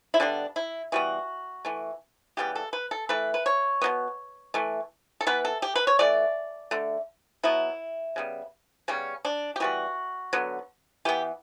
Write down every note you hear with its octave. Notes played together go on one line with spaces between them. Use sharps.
E4
D3 G3 B3 D4
E4
E3 G3 B3 F#4
E3 A3
C#3 E3 G3 B3 G4
A4
B4
A4
E3 A3 B4
B4
C#5
B2 F#3 B3
E3 A3
A4
E3 B3 B4
A4
G4
B4
C#5
E3 A3 D5
D3 A3
B2 F#3 B3 E4
C#3 G3 B3
C#3 G3 B3 C#4
D4
G4
E3 G3 B3 F#4
D3 F#3 B3
E3 B3 G4